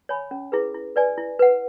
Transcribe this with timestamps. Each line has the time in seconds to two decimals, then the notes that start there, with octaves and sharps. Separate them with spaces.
0.09 C#5 G#5 B5
0.31 C#4
0.52 E4 G#4 B4
0.74 E4
0.96 B4 D5 G#5
1.18 E4
1.39 B4 F#5